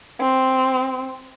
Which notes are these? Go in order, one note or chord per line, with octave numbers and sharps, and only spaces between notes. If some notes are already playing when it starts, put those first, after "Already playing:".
C4